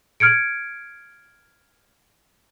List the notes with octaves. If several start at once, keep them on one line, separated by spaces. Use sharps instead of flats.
F6 G#6 C#7 D7